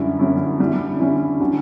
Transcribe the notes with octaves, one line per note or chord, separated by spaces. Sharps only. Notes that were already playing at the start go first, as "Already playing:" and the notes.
Already playing: F#2 D3 G3 C#4 E4
F#2 D3 G3 C#4 E4
D3 G3 C#4 E4
D3 G3 C#4 E4
D3 F#3 C#4